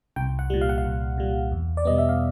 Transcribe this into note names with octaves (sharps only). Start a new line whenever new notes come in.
C2 G5
F#5
A#2 G3
F5
F#5
F5
C2
A#2 G3
E2
D5
B2 G3 B3 D#5
E5
F5